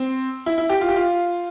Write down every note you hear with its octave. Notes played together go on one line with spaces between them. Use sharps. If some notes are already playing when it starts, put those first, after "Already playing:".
Already playing: C4
E4
E4
G4
F4
G4
F4